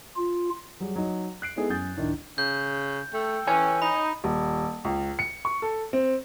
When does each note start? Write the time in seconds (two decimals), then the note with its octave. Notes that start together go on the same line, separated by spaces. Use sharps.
0.17 F4
0.80 F#3 G3 G#4
0.96 F#3 D#4
1.42 F#6 C7 D7
1.56 G#3 B3 D#4 E4 G#4 A4
1.70 F#2 G#5 D#6 G6 A6
1.97 D1 D#3 D4 E4
2.38 C#3 G6
3.13 A3 A4 G5
3.47 E3 C#5 G#5
3.82 D#4 B5
4.24 D#1
4.85 C#2
5.19 C#7
5.45 C#6
5.62 A4
5.93 C4